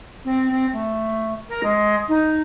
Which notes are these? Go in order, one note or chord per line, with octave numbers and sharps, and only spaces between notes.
C4
C4
A3
A#4
G#3
D#4